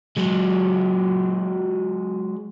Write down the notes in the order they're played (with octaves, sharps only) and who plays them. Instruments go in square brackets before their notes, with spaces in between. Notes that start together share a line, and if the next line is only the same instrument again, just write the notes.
[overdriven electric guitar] F#3 G#3